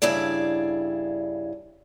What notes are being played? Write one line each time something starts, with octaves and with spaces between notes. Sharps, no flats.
G2 C#3 E4 G#4 D5